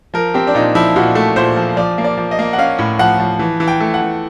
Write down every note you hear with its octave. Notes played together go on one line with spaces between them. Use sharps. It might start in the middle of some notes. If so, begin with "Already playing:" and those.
F3 A#4
C4 G4
D4
A#2 D#4
F3 E4
A#2 F#4
A3
A#2 C5
F3
F3 D5
A#3
D5
F3
D#5
A#3
F#5
C#4 F5
A2
F3 F#5
F3
E3
E3
G5
A3
F#5
E3